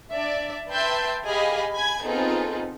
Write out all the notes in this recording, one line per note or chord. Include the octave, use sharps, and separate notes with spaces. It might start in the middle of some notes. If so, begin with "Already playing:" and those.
D4 D5 E5
B4 E5 G5 A5 C6 G6
G4 G#4 D#5 F5 G#5 B5
G#5 B5 G#6
B3 C4 D#4 F4 G#4 A4